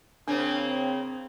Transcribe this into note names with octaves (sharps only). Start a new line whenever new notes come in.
C#3 A#3 C4 D4